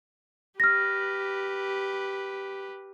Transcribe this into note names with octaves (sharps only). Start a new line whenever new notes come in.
G4 B4 F6 A#6